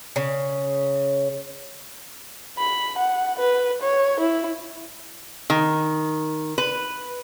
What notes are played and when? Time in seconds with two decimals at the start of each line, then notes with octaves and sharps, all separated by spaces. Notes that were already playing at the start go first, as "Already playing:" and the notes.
0.16 C#3
2.58 B5
2.99 F#5
3.39 B4
3.82 C#5
4.20 E4
5.50 D#3
6.58 B4